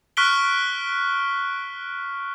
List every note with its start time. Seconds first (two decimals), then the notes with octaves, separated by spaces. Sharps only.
0.17 C#6 F6 F#6 B6 D7 G7